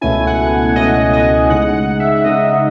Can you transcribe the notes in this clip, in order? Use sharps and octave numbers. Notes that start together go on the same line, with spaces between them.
C#2 B2 A3 C#4 E4 G#5
F#5
C#2 B2 A3 C#4 E4 D#5
D#5
C#3 G#3 D#4 F#5
F#5
E5
C#3 G#3 D#4 D#5